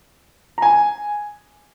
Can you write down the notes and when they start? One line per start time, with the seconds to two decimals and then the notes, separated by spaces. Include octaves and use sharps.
0.58 A#5
0.62 G#5